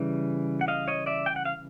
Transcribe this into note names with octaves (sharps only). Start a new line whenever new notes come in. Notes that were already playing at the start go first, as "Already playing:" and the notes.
Already playing: C#3 E3 G3
F#5
D#5 F5
C#5 D#5
D5 E5
G5
F#5
F5